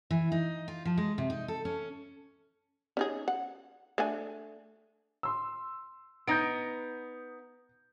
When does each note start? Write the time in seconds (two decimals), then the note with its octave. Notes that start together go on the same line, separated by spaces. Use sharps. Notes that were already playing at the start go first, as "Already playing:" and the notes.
0.11 E3
0.32 D#4
0.68 F4
0.85 F3
0.98 G#3
1.18 C3
1.30 D#4
1.48 A4
1.65 C#4
2.97 C#4 D#4 G#4
3.28 F#5
3.98 A3 D4 G#5
5.23 C6 E6
6.27 B3 D#4 G6 A#6 D7